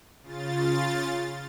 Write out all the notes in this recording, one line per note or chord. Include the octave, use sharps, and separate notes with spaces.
C#3 F4 A6